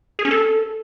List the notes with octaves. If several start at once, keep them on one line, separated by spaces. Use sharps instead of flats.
G#4
C#4
A4